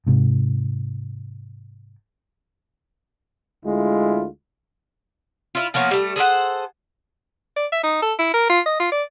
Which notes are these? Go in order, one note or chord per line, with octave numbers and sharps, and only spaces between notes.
G#2 C3
D2 G#3 E4 F4
E4 F4
F3 A#3 B3 C#5
G3 A3
G#4 A4 C5 F#5
D5
E5
D#4
A4
E4
A#4
F4
D#5
F4
D5